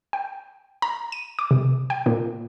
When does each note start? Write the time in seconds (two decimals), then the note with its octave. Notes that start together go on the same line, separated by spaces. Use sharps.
0.13 G5
0.82 A#5
1.12 D#7
1.39 D6
1.51 C3
1.90 G5
2.06 A#2